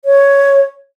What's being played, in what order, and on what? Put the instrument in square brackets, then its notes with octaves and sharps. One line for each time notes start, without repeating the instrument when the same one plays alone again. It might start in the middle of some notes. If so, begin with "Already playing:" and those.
[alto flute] C#5